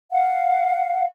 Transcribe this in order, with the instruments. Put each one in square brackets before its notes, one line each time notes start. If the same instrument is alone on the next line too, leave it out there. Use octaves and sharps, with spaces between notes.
[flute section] F5 F#5